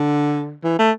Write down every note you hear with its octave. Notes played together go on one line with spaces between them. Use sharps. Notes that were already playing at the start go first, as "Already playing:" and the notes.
Already playing: D3
E3
A3